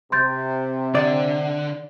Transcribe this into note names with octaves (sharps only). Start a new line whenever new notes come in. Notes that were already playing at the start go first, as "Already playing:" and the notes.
C3 C6 G6 A6
D3 D5